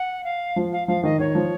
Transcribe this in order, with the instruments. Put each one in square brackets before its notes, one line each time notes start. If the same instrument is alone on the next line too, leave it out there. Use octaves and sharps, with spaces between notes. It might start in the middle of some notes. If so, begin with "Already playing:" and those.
Already playing: [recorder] F#5
F5
[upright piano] F3
[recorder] F5
[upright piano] F3 [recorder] F5
[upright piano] D#3 [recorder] D#5
[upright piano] D#3 [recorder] C#5
[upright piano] F3